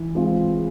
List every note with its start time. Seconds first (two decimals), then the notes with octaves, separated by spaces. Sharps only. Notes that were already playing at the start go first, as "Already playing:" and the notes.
Already playing: E3
0.15 G#3 C4 F4 G#4